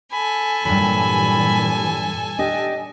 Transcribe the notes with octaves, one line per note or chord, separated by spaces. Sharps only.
A4 G#5 B5
G2 A#2 E3 F#3 G3 B5
D4 G4 D#5